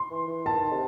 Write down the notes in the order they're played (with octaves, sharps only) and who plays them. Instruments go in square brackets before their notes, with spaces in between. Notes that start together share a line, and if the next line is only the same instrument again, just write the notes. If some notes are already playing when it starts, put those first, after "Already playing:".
Already playing: [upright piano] C6
[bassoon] E3
E3
[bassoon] D#3 [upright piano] A5
[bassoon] C3